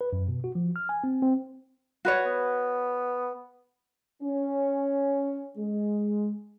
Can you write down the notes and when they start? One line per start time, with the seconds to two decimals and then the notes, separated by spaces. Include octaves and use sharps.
0.01 B4
0.13 F#2
0.28 B2
0.44 F#4
0.55 F3
0.76 F6
0.89 G#5
1.04 C4
1.22 C4
2.05 F#4 B4 C#5
2.25 B3
4.23 C#4
5.58 G#3